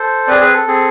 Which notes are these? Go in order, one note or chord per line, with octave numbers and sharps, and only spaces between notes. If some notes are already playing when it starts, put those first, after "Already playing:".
Already playing: A4 C5
C4 G#4 B4 D5
G#4 B4
A4
C4 G#4